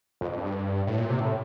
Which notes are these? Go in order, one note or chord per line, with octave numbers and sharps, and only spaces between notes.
F2
G2
A2
A#2
C3
A2